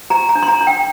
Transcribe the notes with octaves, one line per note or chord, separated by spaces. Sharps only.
G4 A#5
A#5
D4
C6
A#5
D4
G5